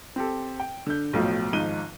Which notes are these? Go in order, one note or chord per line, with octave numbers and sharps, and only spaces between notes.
C4 G4 A4
G5
D3 G6
B1 A2 F3 F#3
G#1 G#2 F3 D#4 D#7 G7